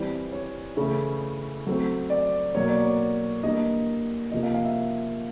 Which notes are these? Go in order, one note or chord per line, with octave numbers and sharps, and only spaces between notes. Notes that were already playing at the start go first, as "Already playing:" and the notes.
Already playing: E3 G3 C4 E4 D5
C#5
C#3 E3 A3 C#4 E4
F#3 A3 C4
D5
B2 F#3 A#3 C#5
D5
C#5
E3 G3 A#3 D4 D#5
C3 F3 A#3 D#5
F5
F5
E5